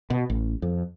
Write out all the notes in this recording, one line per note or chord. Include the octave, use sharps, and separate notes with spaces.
B2
A1
F2